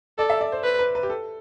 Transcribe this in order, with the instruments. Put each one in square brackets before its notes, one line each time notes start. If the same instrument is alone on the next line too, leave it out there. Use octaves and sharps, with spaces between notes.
[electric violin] A4 [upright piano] D5
[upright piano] E5
D5
C5
[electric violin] B4
[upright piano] B4
B4
G4
A4